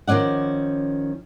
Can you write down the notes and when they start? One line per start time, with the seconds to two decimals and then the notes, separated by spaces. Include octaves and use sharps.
0.07 D#3 F3 C#4 D5 F#5